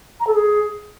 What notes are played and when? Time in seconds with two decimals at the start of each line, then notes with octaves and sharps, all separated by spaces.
0.20 A#5
0.27 A4
0.34 G#4